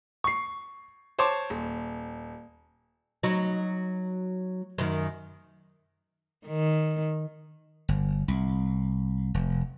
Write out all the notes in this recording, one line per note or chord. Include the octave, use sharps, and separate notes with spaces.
C#6 C7
C5 C#5 A5 C6 D6
D#1
F#3 D#4
F#2 D#3
D#3
G1
C2
F1